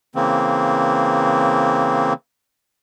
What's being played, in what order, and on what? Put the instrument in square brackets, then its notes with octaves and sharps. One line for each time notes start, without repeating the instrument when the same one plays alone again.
[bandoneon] C#3 E3 A#3 C4